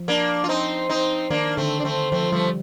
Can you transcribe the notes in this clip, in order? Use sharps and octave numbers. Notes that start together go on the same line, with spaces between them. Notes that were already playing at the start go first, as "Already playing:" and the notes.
Already playing: F3
A#3 D4
F4
C4 D#4
C4 D#4
D#3 A#3 D4
D3 A3 C4
D4
A3 C4
F3 A3 C4
F3 G3 A3